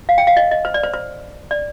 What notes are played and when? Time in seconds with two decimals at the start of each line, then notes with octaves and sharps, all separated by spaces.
0.09 F5
0.18 G5
0.27 F5
0.37 D#5
0.51 D#5
0.65 C5
0.74 D5
0.83 C5
0.94 C5
1.51 D5